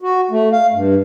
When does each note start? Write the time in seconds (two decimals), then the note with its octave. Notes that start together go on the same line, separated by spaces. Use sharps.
0.02 F#4
0.31 A3
0.52 F5
0.73 G2